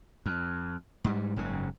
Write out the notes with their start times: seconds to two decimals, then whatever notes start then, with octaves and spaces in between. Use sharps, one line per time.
0.26 F2
1.04 G#2 G3
1.36 F#1 G#2 C#3